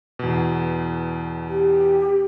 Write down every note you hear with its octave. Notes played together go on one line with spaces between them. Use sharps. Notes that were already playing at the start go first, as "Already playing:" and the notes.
E2 B2
G4